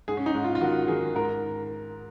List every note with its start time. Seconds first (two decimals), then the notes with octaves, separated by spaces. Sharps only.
0.08 G#2 G#4
0.17 C#4
0.26 D#4
0.34 G#2
0.44 F4
0.55 F4
0.61 D#3 F#4
0.88 D#3 G#4
1.15 G#2 A#4